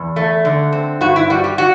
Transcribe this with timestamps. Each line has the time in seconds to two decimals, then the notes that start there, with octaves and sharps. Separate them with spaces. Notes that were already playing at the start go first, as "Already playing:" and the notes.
Already playing: E2
0.16 A3
0.45 D3
0.73 C4
1.01 G2 F#4
1.16 E4
1.30 G3 F#4
1.44 G4
1.58 F#4